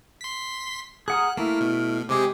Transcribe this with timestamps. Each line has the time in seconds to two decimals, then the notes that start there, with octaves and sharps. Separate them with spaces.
0.21 C6 B6
1.08 G#4 F#5 A#5 D#6 F6 F#6
1.37 A3 A#3 E4 F6
1.61 B2
2.09 C3 G#3 G4 G#4 D6